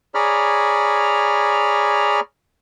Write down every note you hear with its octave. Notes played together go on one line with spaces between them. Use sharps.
G#4 C#5 D5 A#5 B5 F6